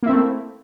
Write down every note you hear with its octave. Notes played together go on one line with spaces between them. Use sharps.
A3 A#3 C4 E4